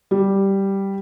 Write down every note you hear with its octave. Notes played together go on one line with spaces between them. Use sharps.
G3